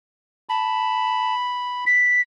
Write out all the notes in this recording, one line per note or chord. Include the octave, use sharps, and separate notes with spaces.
A5 B5
B6